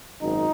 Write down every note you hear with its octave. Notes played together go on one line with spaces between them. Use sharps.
G#1 F#2 D#4